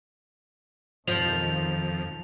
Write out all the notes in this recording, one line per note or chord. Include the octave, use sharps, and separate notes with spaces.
B1 F2 D#3 F3 F7